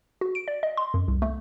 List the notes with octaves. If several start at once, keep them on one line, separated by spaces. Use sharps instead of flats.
F#4
D7
D5
D#5
C6
F#2
C2
A3